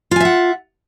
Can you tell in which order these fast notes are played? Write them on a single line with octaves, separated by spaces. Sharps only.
F4 G#5 E5 F#5